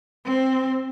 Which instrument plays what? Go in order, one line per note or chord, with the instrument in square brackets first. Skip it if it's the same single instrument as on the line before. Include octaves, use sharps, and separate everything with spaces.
[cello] C4